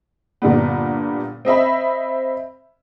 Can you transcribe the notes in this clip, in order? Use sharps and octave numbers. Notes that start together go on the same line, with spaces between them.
G2 A#2 D3 G3 B3
C4 D#5 E5 B5